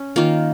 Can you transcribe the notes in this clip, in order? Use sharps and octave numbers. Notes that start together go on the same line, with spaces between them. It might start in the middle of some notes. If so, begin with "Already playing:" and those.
Already playing: C#4
D#3 A#3 F4